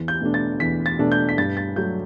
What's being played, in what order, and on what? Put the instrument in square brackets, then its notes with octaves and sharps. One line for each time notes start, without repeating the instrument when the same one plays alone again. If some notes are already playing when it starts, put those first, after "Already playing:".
Already playing: [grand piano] E2
G6
B2 A3 D4
A6
E2 B6
A6
B2 A3 D4
G6
B6
G2 A6
A6
F#3 A3 D4 G6